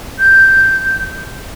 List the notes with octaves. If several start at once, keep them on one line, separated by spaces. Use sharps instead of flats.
G6